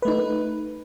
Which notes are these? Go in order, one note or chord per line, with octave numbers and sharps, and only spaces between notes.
A3 D#4 B4